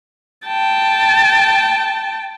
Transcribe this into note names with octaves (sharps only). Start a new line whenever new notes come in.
G5 A5